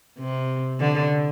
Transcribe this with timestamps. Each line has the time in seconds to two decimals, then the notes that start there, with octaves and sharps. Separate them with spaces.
0.18 C3
0.80 D3